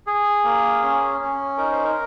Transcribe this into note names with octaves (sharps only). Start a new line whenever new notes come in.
G#4
A#3
C#4
C#4
D#4 A#4
C5
A#4